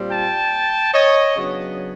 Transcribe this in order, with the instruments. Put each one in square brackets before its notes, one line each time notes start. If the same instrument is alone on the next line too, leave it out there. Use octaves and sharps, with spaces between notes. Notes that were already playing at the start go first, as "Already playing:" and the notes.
Already playing: [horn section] A#2 G3 C4
G5 A5
C#5 D#5
C#3 F#3 B3 D4